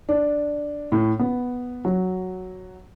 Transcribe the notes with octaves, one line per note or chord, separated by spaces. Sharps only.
D4
A2
B3
F#3